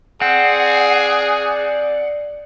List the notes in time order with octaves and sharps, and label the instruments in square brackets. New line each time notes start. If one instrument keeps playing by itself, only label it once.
[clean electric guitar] C4 [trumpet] G#4 [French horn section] D5 [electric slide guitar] F#5